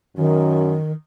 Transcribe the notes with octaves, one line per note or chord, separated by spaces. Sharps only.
F#2 D#3